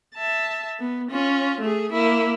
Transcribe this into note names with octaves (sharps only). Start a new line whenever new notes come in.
E5 A5
B3
C#4 F4
A3 G#4
A#3 E4